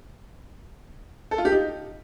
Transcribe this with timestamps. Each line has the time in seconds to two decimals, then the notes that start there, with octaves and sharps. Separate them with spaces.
1.31 A4
1.38 F4
1.45 G4
1.52 D#4